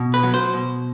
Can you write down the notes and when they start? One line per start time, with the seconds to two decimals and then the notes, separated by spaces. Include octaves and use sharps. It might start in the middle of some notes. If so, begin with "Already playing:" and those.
Already playing: B2
0.14 B4
0.23 F#3
0.34 C5
0.54 B2